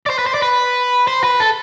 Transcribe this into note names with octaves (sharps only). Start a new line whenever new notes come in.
D5
C5
B4
C5
D5
B4
C5
B4
A4